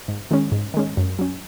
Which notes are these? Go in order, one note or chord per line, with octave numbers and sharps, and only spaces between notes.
G#2
D#3 G#3 C#4
G#2
D#3 G#3 C#4
F#2
F#3 C#4